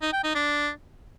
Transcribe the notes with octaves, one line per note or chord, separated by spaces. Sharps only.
D#4
G5
D#4
D4